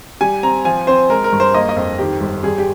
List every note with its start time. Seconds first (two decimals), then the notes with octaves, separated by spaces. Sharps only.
0.21 G3 G#5
0.43 C4 A#5
0.65 F3 G#5
0.87 C4 C5
1.10 G#3 A#4
1.24 A#4
1.32 G2
1.40 C5
1.54 A#3 D#5
1.69 D#5
1.76 F2
1.99 D#3 G4
2.21 G1 G4
2.43 G3 G#4
2.58 G4